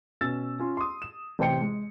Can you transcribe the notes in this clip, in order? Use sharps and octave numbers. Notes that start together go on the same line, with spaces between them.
B2 C#4 E6 A6
C#4 F4
C6 D#6
E7
A1 C3 C5 G5 C#7
G#3